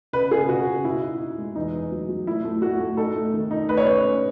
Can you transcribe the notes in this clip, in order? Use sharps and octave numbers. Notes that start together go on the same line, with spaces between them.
C#3 B4
C#3 G#4
C#3 F#4
C#3
B2 E4
D#4
D#4
G#3
E2 D#4
E2
F#3
F#3
A3 E4
A3
A3 F#4
A3
D#4 A4
A3
D#3
D#4
A3 B4
C#5
C#4 B4
C#4